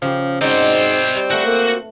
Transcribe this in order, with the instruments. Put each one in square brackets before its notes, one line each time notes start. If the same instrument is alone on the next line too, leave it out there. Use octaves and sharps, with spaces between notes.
[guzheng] C#3 G4 [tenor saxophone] F3
[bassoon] G#2 [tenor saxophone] C4 [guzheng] D#4 F#4 [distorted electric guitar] C5 D5
[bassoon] G3
[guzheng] A3 B4 [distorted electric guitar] F#4
[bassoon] A#3